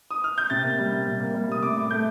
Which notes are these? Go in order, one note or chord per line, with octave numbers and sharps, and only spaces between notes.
D#6
F6
G6
C3 A6
A#3
G3
C3
C3
A#3
G3
C3 D#6
A2 D6
A2
A3 G6